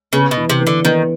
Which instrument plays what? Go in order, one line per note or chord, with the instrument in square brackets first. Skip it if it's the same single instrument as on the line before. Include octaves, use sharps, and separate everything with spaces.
[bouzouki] C#3 [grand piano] B3
[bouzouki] B2
[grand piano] E3
[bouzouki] C3
[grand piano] E3
[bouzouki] D3
[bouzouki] D#3 [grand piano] B3